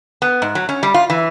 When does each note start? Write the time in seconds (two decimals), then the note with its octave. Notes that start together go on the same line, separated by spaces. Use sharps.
0.22 B3
0.42 G#2
0.55 F#3
0.69 C#4
0.83 G3
0.94 F4
1.10 E3